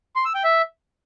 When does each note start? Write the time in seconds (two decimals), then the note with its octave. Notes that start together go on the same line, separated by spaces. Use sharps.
0.16 C6
0.25 E6
0.35 G5
0.44 E5